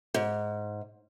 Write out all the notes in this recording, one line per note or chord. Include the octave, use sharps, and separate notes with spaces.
G#2